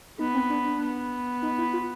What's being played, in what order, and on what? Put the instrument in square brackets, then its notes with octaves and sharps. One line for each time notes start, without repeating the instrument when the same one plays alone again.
[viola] B3 [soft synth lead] D#4
[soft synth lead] C4
D4
D4
[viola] B3
[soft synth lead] D#4
E4
F4